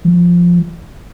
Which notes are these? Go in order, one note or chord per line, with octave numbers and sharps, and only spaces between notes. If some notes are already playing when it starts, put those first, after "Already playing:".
F3